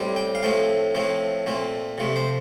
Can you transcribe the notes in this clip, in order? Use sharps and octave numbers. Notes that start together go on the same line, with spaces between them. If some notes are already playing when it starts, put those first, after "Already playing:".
Already playing: A2 G3 C4
G5
F5
A2 F3 A3 C4 G5
A2 F3 A3 C4
A#2 A3 C4
C3 F3 A3
C5